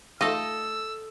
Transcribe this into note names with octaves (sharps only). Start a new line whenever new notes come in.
A3 D#4 F4 A4 D#5 E6